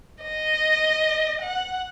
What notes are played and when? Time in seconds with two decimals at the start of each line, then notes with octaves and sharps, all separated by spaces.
0.24 D#5
1.42 F#5